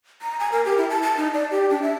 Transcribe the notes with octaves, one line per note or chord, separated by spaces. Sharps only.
A#5
G#5
A#4
G4
E4
A5
A5
D#4
D5
G4
D4
E5